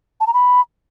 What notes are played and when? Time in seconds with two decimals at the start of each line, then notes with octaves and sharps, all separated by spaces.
0.20 A5
0.27 A#5
0.34 B5